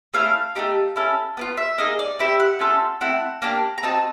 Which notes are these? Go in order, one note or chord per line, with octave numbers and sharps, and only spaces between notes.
A3 C#4 E4 F5
A3 C4 D#4 G4
C#4 E4 A4
B3 D4 F4
E5
A#3 D#4 G#4 D#5
D5
C4 E4 G4 E5
F#5
A3 C#4 F4 A4
A3 C4 E4 F#5
A#3 D4 G4
A#5
C4 D#4 F#4 A5